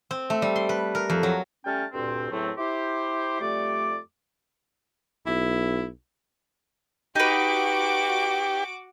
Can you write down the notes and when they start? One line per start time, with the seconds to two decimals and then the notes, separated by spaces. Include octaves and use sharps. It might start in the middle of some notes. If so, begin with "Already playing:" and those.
0.11 C4
0.30 A3
0.42 G3
0.56 C6
0.69 B4
0.95 A#4
1.10 F2
1.23 F#3
1.65 G3 A3 C#4 G5 A5 F6
1.93 D2 G2 A#2 C4
2.31 E2 A2 F#3 A3 C4
2.58 E4 G4 C5
3.40 F2 G3 A3 D5 D6
5.27 B1 E4
7.15 D#4 F#4 G4 B4 D6